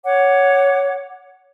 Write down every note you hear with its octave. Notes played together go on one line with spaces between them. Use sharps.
C#5 F#5 D6